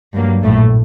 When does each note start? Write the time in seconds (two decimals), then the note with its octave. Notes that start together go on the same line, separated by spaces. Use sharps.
0.15 G2 F#3 A#3
0.43 A#1 A2 A3